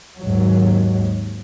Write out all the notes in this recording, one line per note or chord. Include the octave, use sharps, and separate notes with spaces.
D#2 G#2 F#3